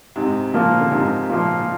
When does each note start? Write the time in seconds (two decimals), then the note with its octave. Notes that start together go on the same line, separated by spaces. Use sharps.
0.16 G#2 C3
0.54 A#2 F3 A#3 F4
0.81 D3
0.91 G#2 C3
1.30 A#2 F3 A#3 F4
1.61 A#2